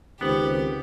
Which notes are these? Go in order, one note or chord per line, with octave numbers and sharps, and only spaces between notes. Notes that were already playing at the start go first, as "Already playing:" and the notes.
C#2 C3 D#3 B3 G4 C5 F#5